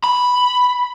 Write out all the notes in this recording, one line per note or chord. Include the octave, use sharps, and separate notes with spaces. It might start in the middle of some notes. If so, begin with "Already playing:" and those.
B5